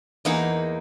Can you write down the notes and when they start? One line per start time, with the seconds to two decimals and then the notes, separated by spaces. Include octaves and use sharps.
0.25 E2 A#3 D#4 F#5